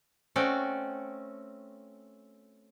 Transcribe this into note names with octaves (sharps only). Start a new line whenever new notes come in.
A3 C4 C#4 F#4 D5 G5